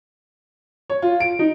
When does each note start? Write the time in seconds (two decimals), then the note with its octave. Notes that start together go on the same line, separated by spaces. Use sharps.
0.90 C#5
1.02 F4
1.20 D7
1.39 D#4